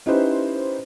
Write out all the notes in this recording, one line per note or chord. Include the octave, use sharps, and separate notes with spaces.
C#4 D#4 E4 G4 B4 C5